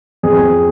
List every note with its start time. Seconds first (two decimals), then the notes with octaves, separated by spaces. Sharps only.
0.23 F2 G#4